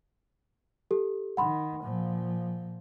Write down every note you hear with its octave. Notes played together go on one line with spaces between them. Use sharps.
G4 A4
D#3 F#5 B5 C6
A#2 F3